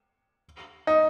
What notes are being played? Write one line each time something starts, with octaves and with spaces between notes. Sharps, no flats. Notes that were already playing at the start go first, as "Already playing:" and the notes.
D#4